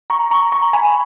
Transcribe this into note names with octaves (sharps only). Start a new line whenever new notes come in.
A#5 C#6
A#5 C#6
A#5 C#6
G#5 B5